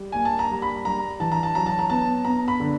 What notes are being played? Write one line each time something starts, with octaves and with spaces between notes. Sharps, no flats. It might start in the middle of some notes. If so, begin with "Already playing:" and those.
Already playing: G3
A#3 G#5
A5
A#5
G3
B5
G3 A#5
E3 A5
A#5
A5
F#3 A#5
A5
A#5
B3 A5
B3 A#5
B5
D3